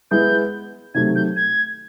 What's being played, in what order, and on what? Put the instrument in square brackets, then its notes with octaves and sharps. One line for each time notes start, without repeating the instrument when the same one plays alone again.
[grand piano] G#3 B3 E4 [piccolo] G6
[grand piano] C3 D#3 F#3 A3 [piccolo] G#6
[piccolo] G6
G#6